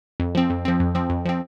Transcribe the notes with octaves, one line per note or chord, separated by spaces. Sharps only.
F2
F3 C4
F2
F3 C4
F2
F3 C4
F2
F3 C4